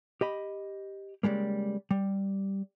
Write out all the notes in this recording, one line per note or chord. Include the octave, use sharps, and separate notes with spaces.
G4 D#5 B5
C#3 E3 G3 G#3 A#3
G3